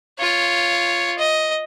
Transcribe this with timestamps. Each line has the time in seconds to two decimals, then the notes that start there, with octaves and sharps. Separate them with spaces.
0.19 F4 C#5
1.19 D#5